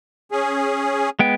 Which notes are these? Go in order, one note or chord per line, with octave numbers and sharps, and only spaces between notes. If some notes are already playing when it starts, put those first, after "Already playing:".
C#4 G#4
G#3 B3 G5